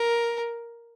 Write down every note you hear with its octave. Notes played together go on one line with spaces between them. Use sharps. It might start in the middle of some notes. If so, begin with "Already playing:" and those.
Already playing: A#4